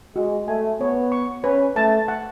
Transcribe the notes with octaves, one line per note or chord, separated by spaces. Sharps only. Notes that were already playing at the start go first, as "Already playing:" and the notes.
G#3 F#4
A3 G#5
B3 C#5
C#6
C#4 B4
A3 A5
F#5